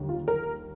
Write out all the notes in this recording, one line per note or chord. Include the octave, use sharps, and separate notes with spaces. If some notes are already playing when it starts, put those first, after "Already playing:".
Already playing: D#2 D3 G3
F4
A#4